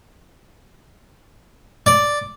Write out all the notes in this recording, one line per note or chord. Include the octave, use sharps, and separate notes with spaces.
D5